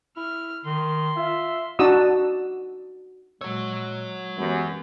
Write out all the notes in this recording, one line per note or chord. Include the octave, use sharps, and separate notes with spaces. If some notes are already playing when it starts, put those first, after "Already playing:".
E4 F6
D#3 C6
F4 E5
D4 D#4 F#4 D5 D#6 E6
A#2 G#3 F#4 C#5 E6
F#2 E3 G#3 B3 G4